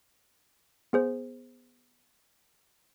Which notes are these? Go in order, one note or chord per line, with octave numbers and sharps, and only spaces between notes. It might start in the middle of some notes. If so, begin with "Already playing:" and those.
B3 G#4 C5